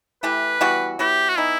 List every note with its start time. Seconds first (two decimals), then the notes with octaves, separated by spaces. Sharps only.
0.23 E3 A3 E4 G4 B4
0.61 E3 G3 B3 F#4
0.99 F#3 B3 E4 G4
1.30 F#4
1.37 E3 B3 D#4 E4